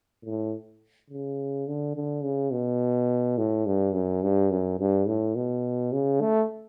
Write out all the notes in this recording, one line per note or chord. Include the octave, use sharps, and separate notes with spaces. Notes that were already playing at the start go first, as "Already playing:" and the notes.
A2
C#3
D3
D3
C#3
B2
A2
G2
F#2
G2
F#2
G2
A2
B2
C#3
A3